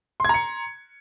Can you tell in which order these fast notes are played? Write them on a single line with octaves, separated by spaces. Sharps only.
C6 G#6 A#5 C#7